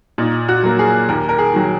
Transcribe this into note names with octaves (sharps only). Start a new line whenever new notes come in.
A#2 D#4
F#4
F#3 A#3
G#4
D#2 A#4
A#4
G#4
D#3 F#3